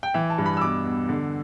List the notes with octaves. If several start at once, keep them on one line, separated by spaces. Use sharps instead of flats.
G5
E3 E5
A5
G2
B5
E6
B2 D6
E2
D3